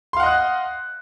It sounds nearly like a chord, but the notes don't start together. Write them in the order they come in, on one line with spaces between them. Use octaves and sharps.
C6 F5 F#5 D#5 F#6